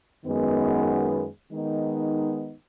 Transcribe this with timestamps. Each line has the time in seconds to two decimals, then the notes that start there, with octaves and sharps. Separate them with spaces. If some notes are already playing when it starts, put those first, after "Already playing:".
0.24 F#2 D#3 G#3 B3
1.51 D#3 G#3 B3 D#4